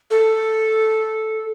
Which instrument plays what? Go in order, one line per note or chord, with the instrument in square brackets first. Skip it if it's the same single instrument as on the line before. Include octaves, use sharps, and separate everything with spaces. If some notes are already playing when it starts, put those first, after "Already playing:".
[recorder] A4